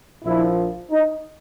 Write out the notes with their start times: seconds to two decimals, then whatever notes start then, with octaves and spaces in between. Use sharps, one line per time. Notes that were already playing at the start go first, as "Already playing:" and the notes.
0.24 A#1 A#2 F3 E4
0.91 D#4